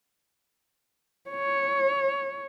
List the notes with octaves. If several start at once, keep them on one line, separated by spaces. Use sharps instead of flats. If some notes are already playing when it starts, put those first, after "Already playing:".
C#5